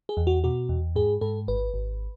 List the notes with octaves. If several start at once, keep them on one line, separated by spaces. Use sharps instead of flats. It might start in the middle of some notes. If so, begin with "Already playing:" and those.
G#4
E2
F#4
B2 F#4
E2
G#2 G#4
G#2 A4
G#1 B4
G#1